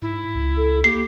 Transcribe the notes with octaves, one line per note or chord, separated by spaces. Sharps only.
G#2 E4
C#2
A4
A#3 G4 C7